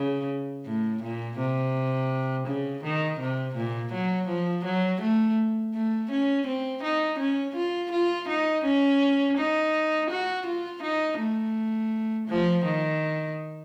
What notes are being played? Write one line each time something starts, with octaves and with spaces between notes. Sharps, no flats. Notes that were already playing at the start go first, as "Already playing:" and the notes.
Already playing: C#3
A2
A#2
C3
C#3
D#3
C3
A#2
F#3
F3
F#3
A3
A3
C#4
C4
D#4
C#4
F4
F4
D#4
C#4
D#4
F#4
F4
D#4
A3
F3
D#3